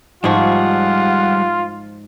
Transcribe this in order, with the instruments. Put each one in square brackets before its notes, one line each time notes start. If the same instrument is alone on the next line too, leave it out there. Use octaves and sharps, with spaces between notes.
[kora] G#2 F3 [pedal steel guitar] G3 G#4 C#6 [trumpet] F4 [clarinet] F#5